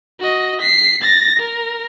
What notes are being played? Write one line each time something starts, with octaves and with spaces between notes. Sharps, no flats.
F#4 D#5
B6 C7
A6 A#6
A#4